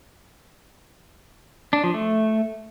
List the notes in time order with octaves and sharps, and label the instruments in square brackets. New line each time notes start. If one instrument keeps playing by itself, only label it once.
[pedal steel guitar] D4
F3
A3